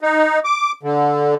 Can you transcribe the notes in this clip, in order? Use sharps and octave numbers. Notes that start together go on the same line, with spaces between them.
D#4
D6
D3